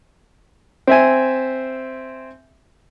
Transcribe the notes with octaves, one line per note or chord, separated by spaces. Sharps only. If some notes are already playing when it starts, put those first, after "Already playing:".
C4 E5 G#5